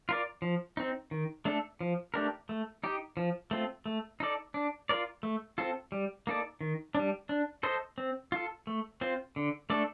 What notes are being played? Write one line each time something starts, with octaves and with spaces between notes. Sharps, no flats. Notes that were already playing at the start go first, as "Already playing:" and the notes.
F4 A#4 D5
F3
C4 D#4
D#3
A3 D4 A4
F3
A3 D4 G4 A#4
A3
D#4 G4
F3
A3 C4 F4
A3
D#4 A4 D5
D4
F4 A#4 D5
A3
C4 F4 A4
G3
A#3 D#4 A4 D5
D#3
G3 D4
D4
A4 C5 D#5
C4
F4 A4
A3
C4 F4 C5
D3
A3 D4 A4 D5